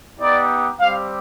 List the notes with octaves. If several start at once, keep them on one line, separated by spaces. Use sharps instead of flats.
B3 D#4 G4 D5
G3 C4 G4 F5